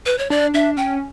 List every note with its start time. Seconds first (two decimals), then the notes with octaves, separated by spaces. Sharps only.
0.06 B4
0.18 C#5
0.30 D4 D5
0.54 D4 E5
0.77 C#4 G5